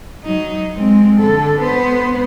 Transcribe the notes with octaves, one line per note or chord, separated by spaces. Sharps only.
F#3 D#4
G#3 C4
D3 A4
B3 C5